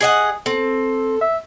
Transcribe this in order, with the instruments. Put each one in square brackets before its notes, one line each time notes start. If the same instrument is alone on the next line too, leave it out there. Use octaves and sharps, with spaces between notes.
[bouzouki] G#4 D#5 F#5
[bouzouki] C4 [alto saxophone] A4
[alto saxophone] E5